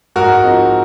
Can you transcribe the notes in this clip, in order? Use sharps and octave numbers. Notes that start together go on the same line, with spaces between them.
G#2 F#4 A#4
F3 C4 D#4